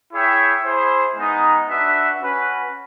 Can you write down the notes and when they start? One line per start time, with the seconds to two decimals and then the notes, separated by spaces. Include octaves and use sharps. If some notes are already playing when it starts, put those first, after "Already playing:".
0.12 E4 G#4 C#5 E5 G5
0.64 E4 G#4 C5
1.17 G#3 B3 D#4
1.69 D4 F#4 B4 E5
2.21 C#4 F#4 B4